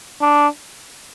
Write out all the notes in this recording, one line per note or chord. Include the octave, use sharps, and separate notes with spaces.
D4